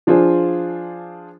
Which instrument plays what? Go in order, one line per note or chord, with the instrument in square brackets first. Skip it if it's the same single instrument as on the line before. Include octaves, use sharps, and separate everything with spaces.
[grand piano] F3 D4 F4 G#4 C5